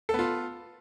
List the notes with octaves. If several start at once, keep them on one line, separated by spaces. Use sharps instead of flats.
B3 F4 A4